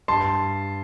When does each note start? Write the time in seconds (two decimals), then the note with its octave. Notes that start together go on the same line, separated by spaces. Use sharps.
0.08 G2 A5 C6